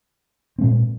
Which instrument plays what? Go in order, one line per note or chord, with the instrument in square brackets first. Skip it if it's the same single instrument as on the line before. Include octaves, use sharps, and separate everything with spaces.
[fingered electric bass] A#2 G#3 C4